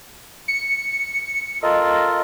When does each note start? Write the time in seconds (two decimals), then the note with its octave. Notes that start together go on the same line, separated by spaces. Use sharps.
0.48 C#7
1.63 F4 A4 A#4 D#5